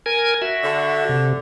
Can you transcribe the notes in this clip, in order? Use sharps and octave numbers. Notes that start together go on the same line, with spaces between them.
A#4 G#5 G#6
F#4 E5
D3
C3